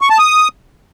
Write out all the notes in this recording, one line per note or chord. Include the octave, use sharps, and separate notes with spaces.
C#6
A5
D#6